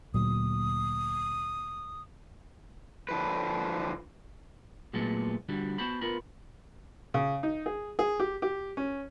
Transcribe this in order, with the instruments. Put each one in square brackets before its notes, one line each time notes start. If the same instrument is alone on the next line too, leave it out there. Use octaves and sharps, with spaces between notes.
[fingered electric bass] D2 A#2 F#3 [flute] D#6
[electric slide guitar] D3 F3 B4
[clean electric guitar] A#2 F#3 G#3 A3 B3 A4
D3 G3 F#4
B3 F#4 C5 A5 B5
B3 F4 A#4 B5
[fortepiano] C#3
D#4
G#4
G#4
G4
G4
C#4